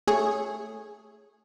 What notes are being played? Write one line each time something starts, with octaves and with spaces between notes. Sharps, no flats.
A3 G#4 C#5